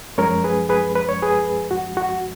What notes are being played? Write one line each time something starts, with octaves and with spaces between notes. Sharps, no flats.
F#2 F3 G#3 C#4 A#4 C#5
G#4 B4
G#4 B4
B4
C#5
G#4 B4
F#4
F#4